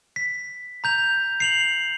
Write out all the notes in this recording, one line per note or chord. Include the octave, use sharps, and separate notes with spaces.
B6
A#5 G6 F7
C7 F7 F#7